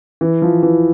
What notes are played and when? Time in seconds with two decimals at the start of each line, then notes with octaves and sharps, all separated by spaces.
0.21 E3
0.42 F3
0.63 E3